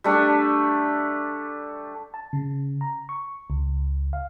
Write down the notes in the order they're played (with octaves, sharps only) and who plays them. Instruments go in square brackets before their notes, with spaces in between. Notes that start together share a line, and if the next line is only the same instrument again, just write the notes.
[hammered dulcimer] G3 A3 D4
[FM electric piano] A5
C#3
A#5
C#6
C#2
F5